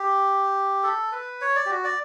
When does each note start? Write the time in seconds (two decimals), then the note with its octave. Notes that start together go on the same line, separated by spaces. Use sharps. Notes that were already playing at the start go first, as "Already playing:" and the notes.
Already playing: G4
0.83 A4
1.12 B4
1.41 C#5
1.56 D5
1.66 G4
1.70 F#4
1.84 D5